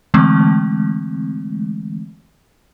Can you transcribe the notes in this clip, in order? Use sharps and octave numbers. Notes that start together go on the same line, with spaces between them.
D3 E3 G#3 A3 C4